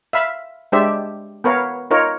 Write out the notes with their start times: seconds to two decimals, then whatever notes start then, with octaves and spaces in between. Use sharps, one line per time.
0.13 E5 F5 B5
0.72 G#3 D4 G4 C5 D5 E5
1.44 B3 A#4 B4 C#5 F5
1.91 D#4 F4 A#4 C#5